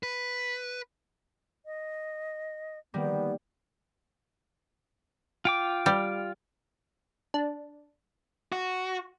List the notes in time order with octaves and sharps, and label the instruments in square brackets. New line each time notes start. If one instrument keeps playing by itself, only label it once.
[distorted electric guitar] B4
[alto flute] D#5
[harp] D#3 G3 A#3 [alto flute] B3
[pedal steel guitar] F4 G5 D6
[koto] G3
[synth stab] D4
[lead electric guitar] F#4